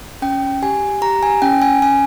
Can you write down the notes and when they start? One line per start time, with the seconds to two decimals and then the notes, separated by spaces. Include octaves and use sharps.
0.22 C#4 G5
0.62 G4 G#5
1.02 G4 A#5
1.23 G#5
1.42 C#4 G5
1.62 G#5
1.82 C#4 G#5